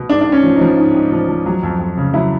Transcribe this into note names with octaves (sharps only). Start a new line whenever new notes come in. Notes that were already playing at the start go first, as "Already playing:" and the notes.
Already playing: B2
G#2 D4
D4
G#2
C#4
F3
D#4
F3
G#2
G#2
F3
F3
F#3
F2
F2
C#3
F#3 E4